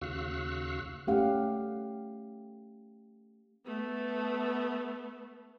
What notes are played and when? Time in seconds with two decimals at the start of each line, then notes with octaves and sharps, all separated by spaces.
0.01 D#2 C#3 F#4 F5 E6 F#6
1.07 A3 C#4 G4 F5 F#5
3.65 A3 B3